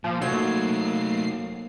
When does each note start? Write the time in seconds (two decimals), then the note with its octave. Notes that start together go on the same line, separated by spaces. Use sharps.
0.04 A#2 F3
0.22 F#3 A3 A#3 D#4 C7